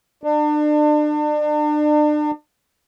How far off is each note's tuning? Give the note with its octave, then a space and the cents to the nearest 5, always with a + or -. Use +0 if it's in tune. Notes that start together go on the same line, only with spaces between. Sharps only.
D4 +35